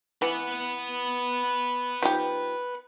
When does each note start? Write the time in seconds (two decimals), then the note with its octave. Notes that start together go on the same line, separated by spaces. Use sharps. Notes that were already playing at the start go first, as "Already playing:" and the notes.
0.22 E3 B4 F#5
2.02 F3 D#4 G4